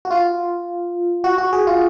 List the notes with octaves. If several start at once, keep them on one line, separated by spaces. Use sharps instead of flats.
F#4
F4
F#4
F#4
G#4
F4